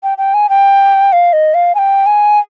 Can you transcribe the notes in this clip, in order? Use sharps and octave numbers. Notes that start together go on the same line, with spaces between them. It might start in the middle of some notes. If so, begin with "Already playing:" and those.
G5
G5
G#5
G5
F5
D#5
F5
G#5
G5
G#5